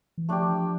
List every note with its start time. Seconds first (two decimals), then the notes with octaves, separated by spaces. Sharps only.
0.18 E3
0.28 F3 A3 D4 G4